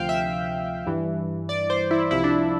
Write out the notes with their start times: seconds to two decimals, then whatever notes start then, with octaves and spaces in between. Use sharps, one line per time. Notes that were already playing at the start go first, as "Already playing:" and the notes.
Already playing: D2 C3 F3 F5 G5
0.09 E5
0.86 G2 E3
1.49 D5
1.70 C5
1.91 E4
2.11 C2 C3 F3 E4
2.24 D4